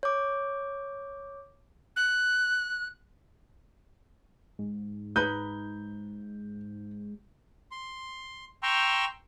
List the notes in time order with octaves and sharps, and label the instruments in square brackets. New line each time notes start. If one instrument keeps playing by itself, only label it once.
[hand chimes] C#5 D6
[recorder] F#6
[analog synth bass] G#2
[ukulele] D#4 B4 B5 [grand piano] G6
[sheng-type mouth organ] C6
G5 A#5 C6 C#6 E6